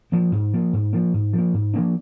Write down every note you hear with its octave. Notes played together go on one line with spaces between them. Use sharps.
F3 A#3
G#2
F3 A#3
G#2
F3 A#3
G#2
F3 A#3
G#2
F3 A#3 D4